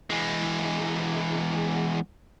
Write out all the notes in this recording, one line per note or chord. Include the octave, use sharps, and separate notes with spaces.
E2 G#3